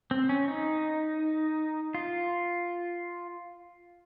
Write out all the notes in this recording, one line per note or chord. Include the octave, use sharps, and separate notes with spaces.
C4
C#4
D#4
F4